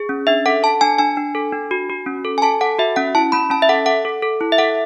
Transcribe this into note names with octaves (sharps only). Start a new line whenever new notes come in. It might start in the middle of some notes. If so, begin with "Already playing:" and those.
Already playing: G#4
C#4
D4 E5
A4 F#5
A4 A5
D4 G#5
D4 G#5
D4
A4
D4
F#4
F#4
C#4
A4
G#5
A4 A5
A4 F#5
F#4 E5
C#4 F#5
E4 A5
C#4 B5
C#4 A5
E5
A4 F#5
A4 F#5
A4
A4
E4
E5
A4 F#5